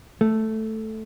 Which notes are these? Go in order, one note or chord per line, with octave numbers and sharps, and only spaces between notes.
A3